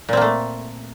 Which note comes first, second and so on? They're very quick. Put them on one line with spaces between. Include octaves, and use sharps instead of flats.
A#2 C4 A#3 A3